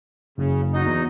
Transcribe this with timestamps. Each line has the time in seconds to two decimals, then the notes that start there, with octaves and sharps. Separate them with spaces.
0.38 F#1 C#3
0.74 F#3 D#4 D#5
0.86 E2